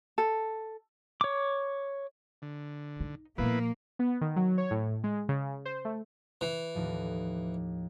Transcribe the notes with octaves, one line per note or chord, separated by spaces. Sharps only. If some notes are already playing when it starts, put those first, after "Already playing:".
A4
C#5 D6
D3
D#4
A#2 F3 A#3 B3 E4 B4
B3
D#3
F#3
C#5
A2
G#3
C#3
C5
A3
E3
D#2 A2 F3